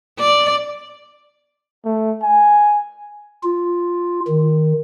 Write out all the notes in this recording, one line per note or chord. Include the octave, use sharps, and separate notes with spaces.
D5
A3
G#5
F4
D#3